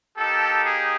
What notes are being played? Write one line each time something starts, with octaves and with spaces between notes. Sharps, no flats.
A#3 D#4 G4 A4
G#4